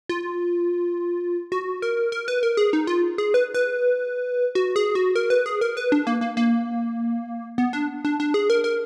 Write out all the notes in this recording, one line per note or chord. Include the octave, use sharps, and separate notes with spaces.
F4
F#4
A#4
A#4
B4
A#4
G#4
D#4
F4
G#4
B4
B4
F#4
G#4
F#4
A#4
B4
G#4
A#4
B4
D4
A#3
A#3
A#3
B3
D4
D4
D4
G#4
A#4
A#4